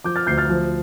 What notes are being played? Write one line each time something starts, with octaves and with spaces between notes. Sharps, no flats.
F3 D6 G6
F6 A6
D2 G6 C7
F6 A6
F3